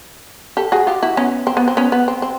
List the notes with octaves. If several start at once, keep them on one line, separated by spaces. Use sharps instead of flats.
G4 A4
F#4 G#4
F4 G4
E4 F#4
B3 C#4
C4
B3
C4
B3 C#4
B3
C4
C4